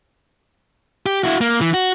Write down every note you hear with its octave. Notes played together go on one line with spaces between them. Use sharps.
G4
E4 F#4
A#3
E3
F#4